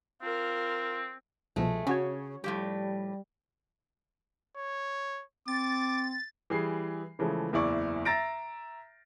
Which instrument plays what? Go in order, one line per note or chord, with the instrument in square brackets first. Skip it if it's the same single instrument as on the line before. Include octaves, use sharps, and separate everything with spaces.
[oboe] C4 [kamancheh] F4 A#4
[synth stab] C2 B2 F3 [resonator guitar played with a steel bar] G#3 A3
[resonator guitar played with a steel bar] C#3 [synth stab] C#4 F#4 C#5
[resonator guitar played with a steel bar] A2 F3 G4 [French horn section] G3
[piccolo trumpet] C#5
[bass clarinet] C4 [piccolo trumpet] D6 [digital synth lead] A6
[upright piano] E3 G3 G#4 C7
C#3 E3 F3 G#3 A3
F#1 E2 E4 D5 C#6
E5 A#5 A6 A#6 D7